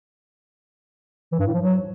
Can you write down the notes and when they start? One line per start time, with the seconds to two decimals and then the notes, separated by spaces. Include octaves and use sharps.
1.32 E3
1.39 G2
1.46 A2
1.54 F3
1.61 F#3